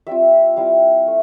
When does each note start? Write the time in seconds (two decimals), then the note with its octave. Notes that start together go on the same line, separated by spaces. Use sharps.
0.07 G3 C4 F4 E5
0.57 G3 C4 E4 F5
1.07 A3